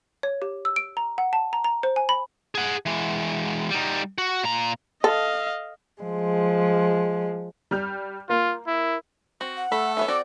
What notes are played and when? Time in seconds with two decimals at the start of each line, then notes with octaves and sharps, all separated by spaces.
0.23 C#5
0.42 G4
0.65 E6
0.76 D7
0.97 A#5
1.18 F#5
1.33 A5
1.53 A#5
1.64 A#5
1.83 C5
1.96 G#5
2.09 B5
2.55 G#4 F#5
2.86 E3 G#3
3.70 G3 D#4
4.18 F#4
4.43 A#2 A#5
5.04 A4 D#5 F5
6.03 F3 G#3
7.71 G3 F6 G6
8.29 A#3 F4
8.67 E4
9.41 C4 F#4
9.57 F#5
9.72 A3 A4 B5
9.97 E3 B3 C#5 E5
10.08 C4 F#4 D5 D6